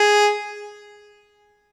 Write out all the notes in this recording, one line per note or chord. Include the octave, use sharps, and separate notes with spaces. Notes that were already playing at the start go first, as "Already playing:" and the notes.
Already playing: G#4